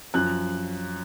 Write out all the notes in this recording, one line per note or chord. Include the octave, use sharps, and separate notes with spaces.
F#2 F3 F#6